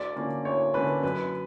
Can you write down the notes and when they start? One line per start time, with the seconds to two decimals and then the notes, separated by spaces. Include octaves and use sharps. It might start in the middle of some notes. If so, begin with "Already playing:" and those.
Already playing: D2 D5
0.16 D3 A#3 C#4
0.45 D2 C#5
0.74 D3 A#3 C#4 B4
1.03 F#2 B4